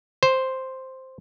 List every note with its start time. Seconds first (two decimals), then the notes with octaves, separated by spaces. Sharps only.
0.23 C5